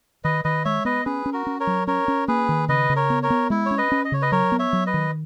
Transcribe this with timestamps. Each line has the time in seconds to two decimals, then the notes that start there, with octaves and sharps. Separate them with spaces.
0.24 D#3 B4 D#5
0.44 D#3 B4 D#5
0.65 G#3 C#5 E5
0.85 B3 B4 D#5
1.05 C#4 G#4 B4
1.26 C#4
1.33 F#4 A#4
1.47 C#4
1.60 A#4 C#5
1.67 F#3
1.87 C#4 A#4 C#5
2.08 C#4
2.28 A#3 G#4 B4
2.49 D#3
2.69 C#3 B4 D#5
2.90 C#3
2.96 A#4 C#5
3.10 B3
3.23 A#4 C#5
3.30 B3
3.50 G#3 E4
3.66 C#4 C#5
3.78 B4 D#5
3.92 C#4
4.05 D#5
4.12 C#3 C#5
4.22 B4 D#5
4.32 F#3 A#4 C#5
4.52 B3
4.59 C#5 E5
4.73 F#3
4.86 B4 D#5
4.94 D#3